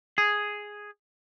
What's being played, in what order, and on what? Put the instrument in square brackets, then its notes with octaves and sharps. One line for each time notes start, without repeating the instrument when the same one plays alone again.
[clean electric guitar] G#4